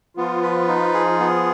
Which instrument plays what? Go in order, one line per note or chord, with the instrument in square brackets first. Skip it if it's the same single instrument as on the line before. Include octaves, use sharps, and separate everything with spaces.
[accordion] F3 F4 [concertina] B3
[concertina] B4
D#4
G#4
B3